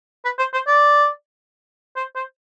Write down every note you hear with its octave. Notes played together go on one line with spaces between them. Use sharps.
B4
C5
C5
D5
C5
C5